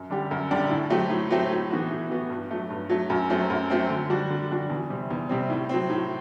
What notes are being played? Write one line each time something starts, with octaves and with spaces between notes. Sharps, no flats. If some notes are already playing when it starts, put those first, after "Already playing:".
Already playing: F#2
D3 G3 D4 G4
F#2
D3 G3 D4 G4
A2
F#3 A3 C4 G4
A2
F#3 A3 C4 G4
A2
E3 B3 F#4
A2
E3 B3 F#4
G2
F#3 A3
G2
F#3 A3
F#2
F#3 A3 C4
F#2
F#3 A3 C4
D3
G3 D4 F#4
D3
G3 D4 F#4
E2
C3 G3 C4
E2
C3 G3 C4
A2
F#3 C4
A2